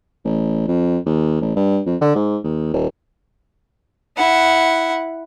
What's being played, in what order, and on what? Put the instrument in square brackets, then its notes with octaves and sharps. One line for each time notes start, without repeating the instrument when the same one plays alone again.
[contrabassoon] A1
F2
D#2
A1
G2
F2
D3
G#2
D#2
D#1
[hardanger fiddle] E4 F#5